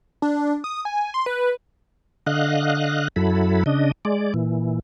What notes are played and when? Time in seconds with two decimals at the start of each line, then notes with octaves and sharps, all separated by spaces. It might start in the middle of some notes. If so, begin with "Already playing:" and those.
0.22 D4
0.64 D#6
0.85 G#5
1.14 C6
1.26 B4
2.27 D3 D#5 F5 F#6
3.16 F#2 F#3 E4 A4 B5
3.66 C#3 D4 D#5
4.05 G#3 D5
4.34 A#2 E3